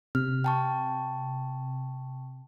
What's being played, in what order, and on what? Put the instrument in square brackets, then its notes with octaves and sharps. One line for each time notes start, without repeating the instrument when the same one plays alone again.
[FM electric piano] C3 [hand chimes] F6
[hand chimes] G5 A5 C#6